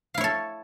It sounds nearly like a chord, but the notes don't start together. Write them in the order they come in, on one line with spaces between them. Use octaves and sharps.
F5 E4 C#5 A4